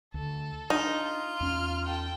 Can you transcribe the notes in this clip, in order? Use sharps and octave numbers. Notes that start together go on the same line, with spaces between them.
D2 A4
D4 D#4 F4
E2 C#4 F6
A4 G5